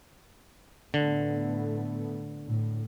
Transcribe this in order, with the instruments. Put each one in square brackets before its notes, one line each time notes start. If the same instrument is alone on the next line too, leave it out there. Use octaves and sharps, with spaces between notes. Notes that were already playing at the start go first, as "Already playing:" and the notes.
[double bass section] A2 A3 B3 [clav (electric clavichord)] D3
[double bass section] A2